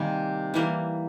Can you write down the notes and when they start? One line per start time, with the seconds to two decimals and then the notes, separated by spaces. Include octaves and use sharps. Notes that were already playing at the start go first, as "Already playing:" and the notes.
Already playing: C3 D#3 G3 A#3 G#5
0.54 E3 G3 A#3